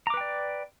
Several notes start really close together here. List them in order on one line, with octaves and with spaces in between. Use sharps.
A#5 D6 B4 G5 D5